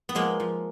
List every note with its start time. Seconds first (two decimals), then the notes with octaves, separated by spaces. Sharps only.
0.09 B3
0.15 F3 G#3 A#3
0.40 F3